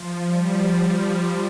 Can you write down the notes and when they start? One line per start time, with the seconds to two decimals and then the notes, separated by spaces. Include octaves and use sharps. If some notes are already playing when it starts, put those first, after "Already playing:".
Already playing: F3
0.27 G3